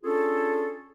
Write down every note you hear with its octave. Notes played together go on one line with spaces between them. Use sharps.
C#4 D4 F4 G#4 A4